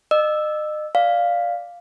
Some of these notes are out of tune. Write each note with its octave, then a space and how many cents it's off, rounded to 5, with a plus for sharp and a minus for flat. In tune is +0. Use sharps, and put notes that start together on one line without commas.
D#5 -35 E6 +0
D5 +0 F5 +0